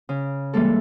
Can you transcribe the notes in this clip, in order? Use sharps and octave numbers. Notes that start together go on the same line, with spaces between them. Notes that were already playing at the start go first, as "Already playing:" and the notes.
C#3
E3 G3 G#3 A#3 A4